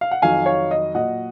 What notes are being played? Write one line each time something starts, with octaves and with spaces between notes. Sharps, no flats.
F5
F#5
F2 D#3 F#3 F5 G#5
C#5 F5
D#5
A#2 F#3 D#5 F#5